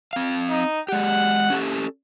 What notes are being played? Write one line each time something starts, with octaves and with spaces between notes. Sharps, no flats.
C4 F5
D#4
G#3 G4 F#5
C#4 G4 A4